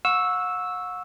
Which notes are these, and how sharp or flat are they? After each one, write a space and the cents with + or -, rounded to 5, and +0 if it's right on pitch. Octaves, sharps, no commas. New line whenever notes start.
F#5 -40 C#6 +0 E6 -5